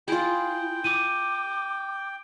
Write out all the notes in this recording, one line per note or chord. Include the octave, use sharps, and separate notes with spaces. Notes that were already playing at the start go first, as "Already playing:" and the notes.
E4 F4 G#4 G5
D6 D#7